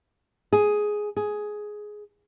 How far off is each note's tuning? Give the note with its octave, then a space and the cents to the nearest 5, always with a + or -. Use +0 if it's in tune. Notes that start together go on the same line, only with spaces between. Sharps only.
G#4 +5
G#4 +10